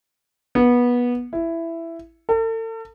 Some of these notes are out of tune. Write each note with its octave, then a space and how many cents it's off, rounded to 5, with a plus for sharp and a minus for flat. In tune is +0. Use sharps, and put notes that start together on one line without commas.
B3 -20
E4 +10
A4 +40